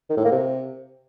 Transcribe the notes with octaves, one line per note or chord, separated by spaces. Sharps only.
D#3
A2
A#3
C3